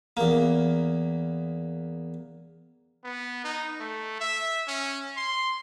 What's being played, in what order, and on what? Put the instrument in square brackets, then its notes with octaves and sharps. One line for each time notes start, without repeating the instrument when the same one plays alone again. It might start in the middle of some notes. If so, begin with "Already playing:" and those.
[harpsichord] E2 A#3
[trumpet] B3
D#4
A3
E5
C#4
C6